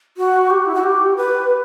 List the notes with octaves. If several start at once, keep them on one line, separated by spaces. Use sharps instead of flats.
F#4
G4
E4
F#4
G4
B4